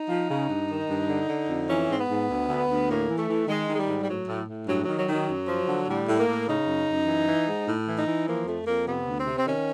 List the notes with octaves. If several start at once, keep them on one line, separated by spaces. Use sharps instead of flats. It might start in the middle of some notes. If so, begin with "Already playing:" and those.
Already playing: D#4
F3
C#3
G2
D#3
G2
D3
D3
F2
E3 C#4
G#2 C4
B3
G#2
D2
D2
D2
A2 A#3
E3
A3
E3
D#3 G#3
D#3
G#3
G3
G#2
G3
A2 F#3
A2
A2
G2 F#3
F#3
D#3
F#3
D#3 F#3
F#2
F3
D3
A2 G3
A2
A#3
A2
C#3 D#4
F#2
F#2
E3
E3
G#2
A2
E3
D#4
E3
F3 A#3
F2 A3
F2 A#3
C3 B3
D2
C4
C3
C4
D#3 C#4